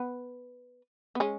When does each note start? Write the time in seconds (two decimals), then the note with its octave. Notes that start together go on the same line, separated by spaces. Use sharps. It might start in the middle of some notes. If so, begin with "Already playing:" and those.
Already playing: B3
1.15 B3
1.20 G#3 C#4